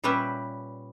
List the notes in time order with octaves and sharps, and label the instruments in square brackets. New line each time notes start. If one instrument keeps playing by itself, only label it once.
[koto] A#2 G3 C#4 G4 B4 E5